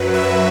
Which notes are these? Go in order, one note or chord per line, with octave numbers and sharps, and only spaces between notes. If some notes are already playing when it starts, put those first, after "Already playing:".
Already playing: F#2 F#3 B4
E5